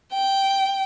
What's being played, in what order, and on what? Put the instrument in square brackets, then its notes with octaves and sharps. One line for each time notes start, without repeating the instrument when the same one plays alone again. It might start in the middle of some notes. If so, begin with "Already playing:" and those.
[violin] G5